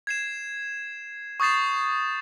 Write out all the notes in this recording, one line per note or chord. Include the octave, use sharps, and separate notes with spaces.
G#6 C7 E7
C#6 D#6 G6 A6 C7 E7